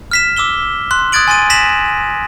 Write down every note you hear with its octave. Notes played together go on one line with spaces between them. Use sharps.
F6 B6 E7
D6 E6 E7 G7
C6 F#6
D#6 F#6 G#6 A6 D7 F#7
G#5 C6 A6 D#7
A#6 B6 E7 F#7